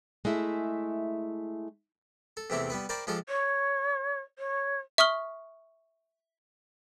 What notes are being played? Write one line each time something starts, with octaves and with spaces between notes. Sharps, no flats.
G#3 A3 E4 E5
A4
E2 C3 A3 C4 E4 G4
G3 B3 B4
A#4 C5 D5 G5 A5 B5
F3 G#3 F4 G4 A4 C5
C#5
C#5
E5 C#6 D#6 F6 G7